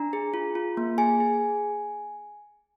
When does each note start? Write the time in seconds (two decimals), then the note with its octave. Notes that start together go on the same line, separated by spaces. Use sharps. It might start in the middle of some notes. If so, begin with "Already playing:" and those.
Already playing: D4 A#5
0.13 G#4
0.34 F4
0.55 F4
0.77 A#3
0.98 G#4 G#5
1.20 G#4